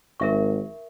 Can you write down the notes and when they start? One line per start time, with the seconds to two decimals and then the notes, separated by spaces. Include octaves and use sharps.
0.20 G#1 A#4 E5 C#6